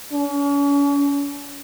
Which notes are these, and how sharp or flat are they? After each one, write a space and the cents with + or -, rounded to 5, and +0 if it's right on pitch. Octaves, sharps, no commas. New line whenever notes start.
C#4 +40